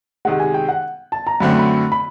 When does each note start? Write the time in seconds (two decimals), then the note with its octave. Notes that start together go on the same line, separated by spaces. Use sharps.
0.25 C3 D#3 G#3 F#5
0.40 G#5
0.54 G5
0.69 F#5
1.12 A5
1.27 A#5
1.40 F#2 D3 F#3 A3 C4 B5
1.59 B5
1.92 B5